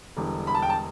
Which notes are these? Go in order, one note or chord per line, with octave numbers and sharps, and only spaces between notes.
E1 E2 D3 G3
B5
A5
G5
A5